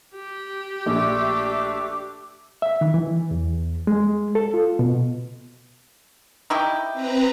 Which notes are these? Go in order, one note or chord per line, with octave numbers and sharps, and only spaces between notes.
G4
A#1 A3 D4 E5 D6
E5
D#3
E3
E2
G#3
A4
F4
B2
D#4 E4 G4
C4 B4 A#5